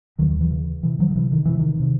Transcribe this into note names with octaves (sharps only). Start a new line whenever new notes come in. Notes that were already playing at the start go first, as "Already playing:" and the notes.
D#2 D#3 F#3
D#3
E3
C#3
C3 E3
D#3 F#3
D#3
C3 E3
D#3
C3 E3
D#3
C3